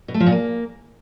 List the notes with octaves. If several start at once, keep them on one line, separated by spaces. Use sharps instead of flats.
B2
A3
F3
A#2
A#3